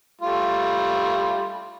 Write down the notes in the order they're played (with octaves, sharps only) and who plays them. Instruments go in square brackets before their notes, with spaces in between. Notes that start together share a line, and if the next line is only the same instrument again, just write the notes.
[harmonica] G3 A3 F4